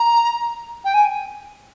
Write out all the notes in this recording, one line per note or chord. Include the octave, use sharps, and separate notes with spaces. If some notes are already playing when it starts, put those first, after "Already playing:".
Already playing: A#5
G5
G#5